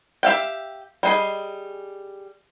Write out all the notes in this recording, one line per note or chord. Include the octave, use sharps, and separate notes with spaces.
G4 E5 F5 G5
G3 G#4 D#5